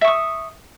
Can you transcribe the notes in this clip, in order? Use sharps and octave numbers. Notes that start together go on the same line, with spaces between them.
E5 C#6 D#6